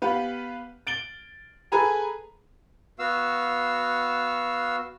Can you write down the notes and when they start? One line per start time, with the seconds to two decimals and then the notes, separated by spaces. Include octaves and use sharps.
0.02 B3 G4 B4 F5
0.87 A6 D7 F#7 G7
1.72 G#4 A4 B4 G#5 A#5 B5
2.99 B3 F#4 F5 E6